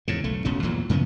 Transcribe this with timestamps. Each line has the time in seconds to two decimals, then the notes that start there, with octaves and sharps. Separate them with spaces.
0.08 E2 G#2 C#3
0.24 B1 A3
0.45 E1 B2 C#4
0.63 E2 A#2 E3 F#3
0.89 F#2 C#3 F3 B3